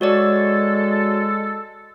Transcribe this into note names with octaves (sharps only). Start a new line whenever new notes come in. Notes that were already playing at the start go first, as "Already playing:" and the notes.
G#3 F#4 A4 C#5 D5